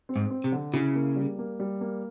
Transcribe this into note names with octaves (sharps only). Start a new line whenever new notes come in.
C4
G#2
C4
C3
D3
C#3 E4
A#3
G3
A#3
G3
A#3